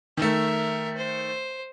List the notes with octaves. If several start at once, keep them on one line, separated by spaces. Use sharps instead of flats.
D#3 A3 A#4 E5
C5